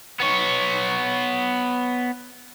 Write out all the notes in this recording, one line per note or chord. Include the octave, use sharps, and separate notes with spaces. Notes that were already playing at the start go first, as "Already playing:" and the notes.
B3 C#5